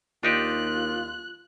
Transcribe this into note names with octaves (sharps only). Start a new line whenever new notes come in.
D#2 D4 D#4 F4 G4 F#6